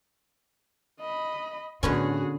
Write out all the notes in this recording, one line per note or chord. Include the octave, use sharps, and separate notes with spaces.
D#5 B5
A2 D3 B3 C#4 F#4 G#4